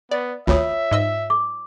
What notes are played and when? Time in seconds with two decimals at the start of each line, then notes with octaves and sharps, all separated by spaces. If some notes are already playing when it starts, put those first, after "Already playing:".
0.11 B3 D5
0.47 G#1 D2 F4 C#5 E5 D#6
0.91 G#2 D#5 E6
1.30 D6